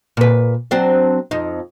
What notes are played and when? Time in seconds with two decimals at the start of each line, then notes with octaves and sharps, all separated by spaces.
0.17 A#2 B4
0.71 F#3 C4 D4
1.31 F2 D#4